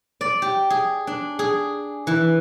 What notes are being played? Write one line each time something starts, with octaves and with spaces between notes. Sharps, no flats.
D5
G4
G#4
D4
G#4
E3